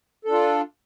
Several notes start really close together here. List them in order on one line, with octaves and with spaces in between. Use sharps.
A4 D4 F4